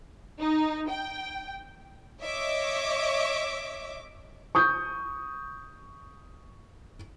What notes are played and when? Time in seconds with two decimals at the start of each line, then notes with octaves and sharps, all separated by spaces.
0.40 D#4
0.89 G5
2.23 C#5 D#5 E5 D6
4.55 C#6 D#6 G6